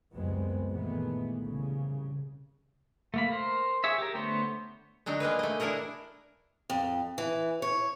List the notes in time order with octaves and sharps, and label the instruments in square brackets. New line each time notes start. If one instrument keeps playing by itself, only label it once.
[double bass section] C#2 F#2 G3 G#3 B3 C4
A#2 D#3 E3 G#3 A3 B3
C2 C#3
[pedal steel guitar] A3 A#3 B5
A#4 C5
G#4 C#5 E5
G4 A#4
D3 A3 B3 C5 C#5
[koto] D3 F#3 D4 D#4
G#3 A#3 G#4 B4
A3 D#5
D4 E4 G#4 A#4 F#5
[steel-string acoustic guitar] F2
E3
C#5